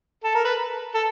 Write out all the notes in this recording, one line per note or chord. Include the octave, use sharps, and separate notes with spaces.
A4
A#4
B4
A4